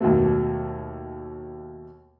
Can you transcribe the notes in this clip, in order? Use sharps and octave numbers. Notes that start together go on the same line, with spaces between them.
D#2 B2 F#3 A3